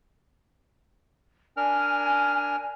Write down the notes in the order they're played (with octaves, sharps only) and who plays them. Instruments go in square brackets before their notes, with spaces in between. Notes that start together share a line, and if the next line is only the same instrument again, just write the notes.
[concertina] D4 A#4 F6 [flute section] G#5